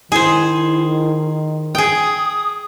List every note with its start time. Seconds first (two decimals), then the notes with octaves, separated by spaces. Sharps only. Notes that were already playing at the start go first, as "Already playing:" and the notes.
0.12 D#3 E4 G#4 C5
1.75 G#4 G5 D#6